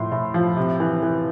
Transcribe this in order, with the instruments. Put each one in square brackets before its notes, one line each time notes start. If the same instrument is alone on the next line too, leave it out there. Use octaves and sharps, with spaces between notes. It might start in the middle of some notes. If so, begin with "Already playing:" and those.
Already playing: [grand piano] A2 F3 C6
A2
F3
C3
E3
E3